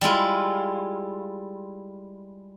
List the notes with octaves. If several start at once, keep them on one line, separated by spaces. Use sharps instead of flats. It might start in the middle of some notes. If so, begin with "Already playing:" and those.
G3 G#3 E4 F4